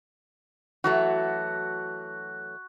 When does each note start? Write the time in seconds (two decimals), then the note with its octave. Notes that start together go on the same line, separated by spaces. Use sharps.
0.84 E3 F#3 A3 F#4